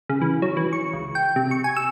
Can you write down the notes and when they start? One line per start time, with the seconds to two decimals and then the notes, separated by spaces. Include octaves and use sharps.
0.09 C#3
0.22 E3
0.42 F#3
0.57 E3
0.73 C#6
0.93 C#2
1.15 G5
1.36 C3
1.51 C#6
1.64 G#5
1.77 E6